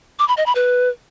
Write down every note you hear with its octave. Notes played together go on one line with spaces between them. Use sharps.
D6
B5
D#5
B5
B4